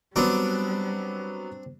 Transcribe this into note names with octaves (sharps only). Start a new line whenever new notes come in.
F#3 G3 B3 C4 D4